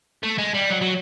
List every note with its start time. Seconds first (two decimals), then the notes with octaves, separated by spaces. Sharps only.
0.23 A3
0.38 G#3
0.54 G3
0.70 F#3
0.81 F#3